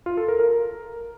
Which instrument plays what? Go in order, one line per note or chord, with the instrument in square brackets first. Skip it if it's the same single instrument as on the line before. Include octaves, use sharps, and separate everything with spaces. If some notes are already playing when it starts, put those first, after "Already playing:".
[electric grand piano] F4
A4
A#4
A#4